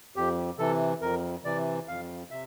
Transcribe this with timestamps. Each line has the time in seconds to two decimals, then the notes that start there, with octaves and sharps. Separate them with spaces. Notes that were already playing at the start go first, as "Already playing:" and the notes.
0.16 F2 G4
0.58 C3 E3 A4
1.01 F2 A#4
1.45 C3 E3 D5
1.88 F2 F5
2.31 C3 E5